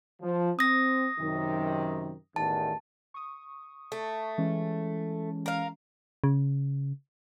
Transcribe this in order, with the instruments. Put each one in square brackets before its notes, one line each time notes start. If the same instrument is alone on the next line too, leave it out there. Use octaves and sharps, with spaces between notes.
[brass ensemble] F3
[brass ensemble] C4 [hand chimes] D#6 A#6
[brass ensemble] F#2 C3 D#3
[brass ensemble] A1 E2 D#3 [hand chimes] A5
[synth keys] C#6 D#6
[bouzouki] A3
[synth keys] E3 G#3 C#4
[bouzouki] A#4 F5
[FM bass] C#3